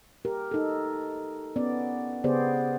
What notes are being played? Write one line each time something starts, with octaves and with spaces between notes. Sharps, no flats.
G4 A#4
D#4 A4
B3 C#4 D5
C#3 B3 G4 G#4 C5 D5